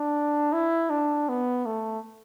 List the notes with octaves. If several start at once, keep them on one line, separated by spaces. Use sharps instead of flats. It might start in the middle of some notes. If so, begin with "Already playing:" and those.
Already playing: D4
E4
D4
B3
A3